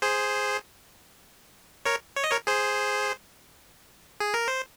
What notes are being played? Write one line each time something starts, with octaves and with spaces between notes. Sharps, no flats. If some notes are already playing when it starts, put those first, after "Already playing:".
G#4 C5
A#4 C#5
C#5
D#5
A#4 C#5
G#4 C5
G#4
A#4
C5